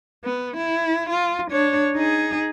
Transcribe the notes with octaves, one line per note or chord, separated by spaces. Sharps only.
B3
E4
F4
D4 C#5
D#4 G#4